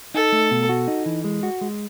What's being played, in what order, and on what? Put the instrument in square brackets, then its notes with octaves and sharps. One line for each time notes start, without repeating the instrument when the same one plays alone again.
[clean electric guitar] D#4 [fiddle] A4
[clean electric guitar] A3
B2
F#4
D#4
E3
G#3
F#4
G#3